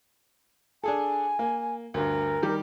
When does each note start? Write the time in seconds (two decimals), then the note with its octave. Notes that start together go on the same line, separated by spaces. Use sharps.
0.84 D4 G#4 A4 G#5
1.39 A#3
1.94 D2 G2 A#4
2.42 D#3 G3 G4